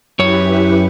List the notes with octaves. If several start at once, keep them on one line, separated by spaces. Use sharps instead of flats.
F#2 E4 G4 B4 C#5